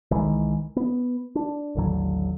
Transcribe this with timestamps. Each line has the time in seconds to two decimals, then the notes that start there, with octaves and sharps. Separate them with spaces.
0.11 C2 D#3 E3 G#3
0.76 B3
1.35 D4
1.75 A1 D#2 D3 F#3